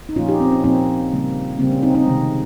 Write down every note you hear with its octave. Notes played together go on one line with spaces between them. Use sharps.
D#4
A#2 F3 A#3 C#4 F4
D#4 G4
C4
C#4
A#2 F3 A#3 C4 D#4
C#3 G3 A#3
C#3 G3 A#3 C4
C#4
C4 D#4
C4 D#4
C3 D#3 G#3